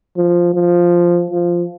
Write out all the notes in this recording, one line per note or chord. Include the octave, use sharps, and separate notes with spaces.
F3
F3
F3